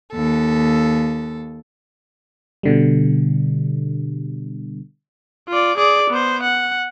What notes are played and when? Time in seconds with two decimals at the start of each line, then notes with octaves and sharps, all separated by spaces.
0.12 D#2 A4
2.63 B2 D3 G3
5.49 F4 D5
5.78 G#4 D5
6.10 B3 C5
6.43 F#5